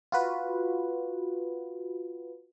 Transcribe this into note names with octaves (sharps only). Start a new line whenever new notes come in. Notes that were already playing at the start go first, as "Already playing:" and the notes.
F4 F#4 B4